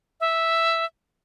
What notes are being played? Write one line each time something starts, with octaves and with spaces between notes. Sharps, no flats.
E5